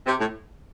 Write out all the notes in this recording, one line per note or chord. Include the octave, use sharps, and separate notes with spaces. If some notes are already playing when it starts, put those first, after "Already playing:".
C3
A2